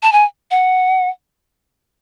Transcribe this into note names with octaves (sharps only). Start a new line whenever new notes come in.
A5
G#5
F#5